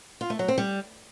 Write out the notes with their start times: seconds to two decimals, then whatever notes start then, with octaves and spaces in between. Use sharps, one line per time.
0.21 F4
0.30 A3
0.39 F#3
0.48 C4
0.58 G3